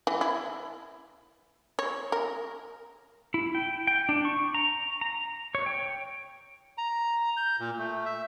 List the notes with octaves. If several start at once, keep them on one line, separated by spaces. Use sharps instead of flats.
E3
E4
C#5
A#4
E4
G5
G5
D4
C#6
A#5
A#5
C#5
G5
A#5
G6
A#2
A3
E5